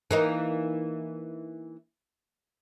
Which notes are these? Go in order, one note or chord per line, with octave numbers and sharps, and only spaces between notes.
E3 A#3 D#4